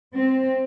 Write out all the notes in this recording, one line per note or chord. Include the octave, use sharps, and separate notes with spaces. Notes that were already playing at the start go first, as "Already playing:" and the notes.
C4